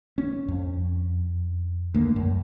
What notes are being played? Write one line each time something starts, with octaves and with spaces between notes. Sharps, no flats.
C#4
F2
D2 A#3
F#2